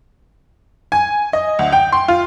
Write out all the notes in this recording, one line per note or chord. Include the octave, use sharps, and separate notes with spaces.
G#5
D#5
D2
G5
C6
F4